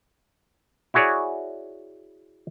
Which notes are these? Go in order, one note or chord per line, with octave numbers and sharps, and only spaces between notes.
E4 F#4 G#4 C#5 D5